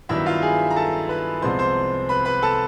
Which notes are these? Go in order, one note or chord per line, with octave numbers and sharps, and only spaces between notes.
G2 D#3 F#3 B3 E4 E5
F4 F5
G#4 G#5
A#5
A4 A5
B4 B5
C2 C3 F3 G#3 B3 C5 C6
C5 C6
B4 B5
B4 B5
A4 A5